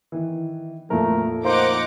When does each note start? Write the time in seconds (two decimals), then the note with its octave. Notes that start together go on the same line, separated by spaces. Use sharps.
0.12 D#3 E3
0.90 F2 A#2 F3 A3 A#4
1.45 A#3 D#4 C5 F#5 D6